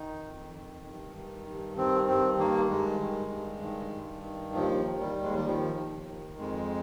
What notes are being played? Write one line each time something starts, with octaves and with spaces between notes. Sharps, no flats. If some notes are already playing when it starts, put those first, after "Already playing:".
Already playing: D#3 D#4
F2
D#3
G2
D#3
G2
D#3 C4
G2 C4
D#3 A#3
G2 G#3
D#3
G2
D#3
G2
D#3
D#2 F3
D#3
G3
D#2
G#3
G3
D#3 F3
D#2
D#3
F2 G#3